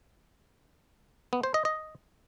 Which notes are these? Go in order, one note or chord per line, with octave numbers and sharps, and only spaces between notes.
B3
C5
D#5
D#5